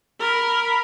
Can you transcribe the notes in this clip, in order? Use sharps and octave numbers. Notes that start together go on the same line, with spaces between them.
A#4 B5